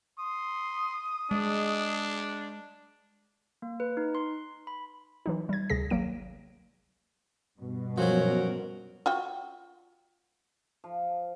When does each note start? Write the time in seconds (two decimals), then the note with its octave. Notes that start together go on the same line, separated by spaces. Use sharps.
0.19 C6 D#6
1.31 G#3 D4
3.62 A#3
3.80 B4
3.97 D#4
4.15 C6
4.67 B5
5.26 E3 F#3 D#4
5.49 G3 G#6
5.70 D2 C3 G#4 A#6
5.90 G#1 F#3 A#3 D7
7.59 G2 B2
7.98 F3 F#3 C#4 F#4 A#4
9.06 F4 F#4 G5
10.84 F3